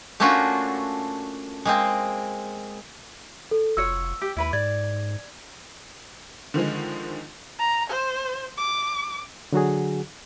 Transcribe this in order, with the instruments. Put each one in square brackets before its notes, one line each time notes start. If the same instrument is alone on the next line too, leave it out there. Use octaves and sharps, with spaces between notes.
[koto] A3 A#3 C#4 D4 F4 F#4
G#3 A#3 C4
[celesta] A4
[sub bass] F1 [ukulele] F4 F#4 C#5 [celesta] E6
[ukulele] G4
[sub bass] D#2 [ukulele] E4 B4 B5
[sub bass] G#2 [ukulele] D5 [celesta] G#6
[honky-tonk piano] D3 D#3 F3 G#3
[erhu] A#5
C5
D6
[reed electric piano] D3 F#3 F#4 G#4